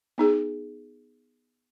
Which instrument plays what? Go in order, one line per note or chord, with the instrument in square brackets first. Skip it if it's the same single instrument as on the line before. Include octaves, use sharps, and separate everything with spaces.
[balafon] B3 D#4 G#4